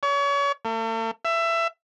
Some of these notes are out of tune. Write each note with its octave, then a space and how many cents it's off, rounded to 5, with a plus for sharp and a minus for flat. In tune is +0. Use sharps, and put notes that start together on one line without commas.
C#5 +35
A3 +45
E5 +20